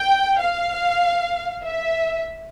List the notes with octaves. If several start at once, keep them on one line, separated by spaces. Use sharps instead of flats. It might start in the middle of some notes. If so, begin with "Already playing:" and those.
Already playing: G5
F5
E5